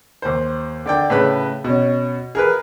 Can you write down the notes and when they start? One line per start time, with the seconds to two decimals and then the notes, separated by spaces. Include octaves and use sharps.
0.22 D#2 C5
0.86 D3 D5 G5
1.10 A2 C#3 B4 B5
1.64 B2 C#4
2.35 G#4 A#4 B4